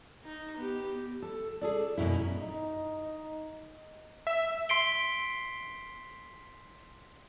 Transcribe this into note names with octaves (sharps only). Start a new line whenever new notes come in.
D#4
B3 G4
A4
G#4 A4 D5
F#2 B2 C#4 E4
D#4
E5
C6 B6 C7 D7 G7